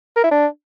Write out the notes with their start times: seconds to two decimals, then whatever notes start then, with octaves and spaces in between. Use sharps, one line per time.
0.17 A#4
0.24 E4
0.31 D4